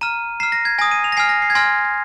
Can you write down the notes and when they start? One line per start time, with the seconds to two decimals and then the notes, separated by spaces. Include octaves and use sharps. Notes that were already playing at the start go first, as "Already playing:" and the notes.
0.01 A#5 F6 D#7
0.40 A#5 F6 C7
0.52 A#6
0.65 G#6
0.79 G#5 D#6 A#6
0.91 D#7
1.04 F7
1.12 A#6
1.17 G#5 F6 C7
1.29 A#6
1.42 C7
1.50 G#6
1.55 G#5 C6 F6 A#6